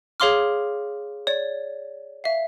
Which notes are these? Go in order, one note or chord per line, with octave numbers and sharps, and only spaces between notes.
G#4 C#5 F5 C6 D6 F6
C#5 D5
E5 F5